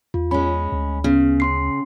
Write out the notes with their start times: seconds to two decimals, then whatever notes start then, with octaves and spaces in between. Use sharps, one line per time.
0.14 E2 F4
0.31 G#3 C#4 B5
0.72 D2
1.04 C#3 B3
1.40 C#4 C6 C7